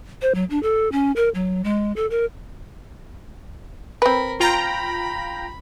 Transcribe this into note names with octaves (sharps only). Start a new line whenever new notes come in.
C5
F#3
D4
A4
C#4
A#4
F#3
G#3
A4
A#4
C4 A#4 B4 B5
F4 G5 A#5 B5